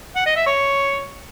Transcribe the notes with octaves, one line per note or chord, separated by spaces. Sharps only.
F#5
D#5
E5
C#5